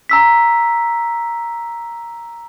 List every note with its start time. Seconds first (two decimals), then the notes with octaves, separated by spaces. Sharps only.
0.09 A#5 E6 B6